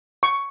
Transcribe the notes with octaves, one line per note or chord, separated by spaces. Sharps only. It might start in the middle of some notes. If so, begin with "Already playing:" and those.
C#6